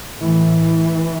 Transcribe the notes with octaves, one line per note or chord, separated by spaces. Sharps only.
A2 E3